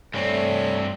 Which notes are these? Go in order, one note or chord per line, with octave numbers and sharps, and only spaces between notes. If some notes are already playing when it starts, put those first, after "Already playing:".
G2 A3 C4 C#5 D5 G#5 B5